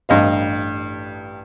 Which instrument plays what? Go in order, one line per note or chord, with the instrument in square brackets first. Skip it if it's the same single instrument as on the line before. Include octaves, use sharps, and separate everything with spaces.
[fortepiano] A1 G2 D#5 F5